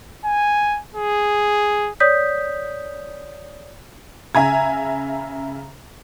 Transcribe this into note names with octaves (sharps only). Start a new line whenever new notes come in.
G#5
G#4
C#5 D5 D#6 G6 B6
C#3 E5 G#5 A#5 G#6